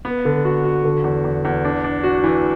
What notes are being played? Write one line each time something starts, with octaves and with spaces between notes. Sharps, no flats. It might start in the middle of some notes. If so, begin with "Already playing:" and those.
B3
D3
F#4
F#4
D3
E2
E2
E2
D4
D4
F#4
E3